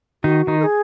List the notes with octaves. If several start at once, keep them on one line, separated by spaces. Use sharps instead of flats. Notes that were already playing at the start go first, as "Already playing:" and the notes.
D#3 D#4 F#4
D#3 D#4
A#4
G#4